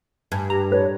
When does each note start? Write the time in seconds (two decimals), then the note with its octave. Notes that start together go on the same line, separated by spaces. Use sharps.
0.32 G2 G#5
0.50 G4 A#5
0.71 A2 B4 C#5